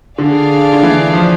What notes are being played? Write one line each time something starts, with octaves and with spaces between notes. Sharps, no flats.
D3 D4 G#4 D5 F5
D3
E3
F3